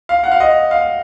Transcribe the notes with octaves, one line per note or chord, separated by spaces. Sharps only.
F5
F#5
F5
D#5
F5